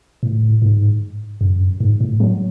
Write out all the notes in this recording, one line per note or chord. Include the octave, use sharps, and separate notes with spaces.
A2
G#2
F#2
G#2
A2
F#3